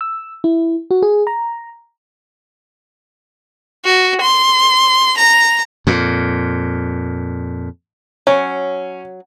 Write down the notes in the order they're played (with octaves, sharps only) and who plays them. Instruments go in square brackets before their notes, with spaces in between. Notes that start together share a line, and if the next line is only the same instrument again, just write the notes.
[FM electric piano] E6
E4
F#4
G#4
A#5
[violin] F#4
C6
A#5
[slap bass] F2 A#2
[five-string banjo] F#3 [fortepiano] C#4